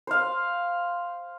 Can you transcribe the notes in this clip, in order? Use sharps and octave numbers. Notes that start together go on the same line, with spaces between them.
C5 F5